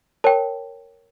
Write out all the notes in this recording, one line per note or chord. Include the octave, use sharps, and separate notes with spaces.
A#4 C#5 G5 A5